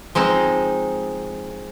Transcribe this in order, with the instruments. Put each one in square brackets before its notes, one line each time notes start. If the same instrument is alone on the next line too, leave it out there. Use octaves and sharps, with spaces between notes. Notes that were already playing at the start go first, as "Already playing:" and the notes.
[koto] F3 G#3 C4 D#4